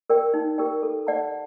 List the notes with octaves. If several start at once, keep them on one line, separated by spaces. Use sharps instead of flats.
G4 A#4 D5 G5
D#4
G4 A#4 D5 G5
A4
D5 F#5 A5